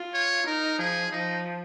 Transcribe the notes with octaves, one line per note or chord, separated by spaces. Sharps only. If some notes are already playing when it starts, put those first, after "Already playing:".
Already playing: F4
C#5
D#4 A#4
F3 G#4
F3 D#4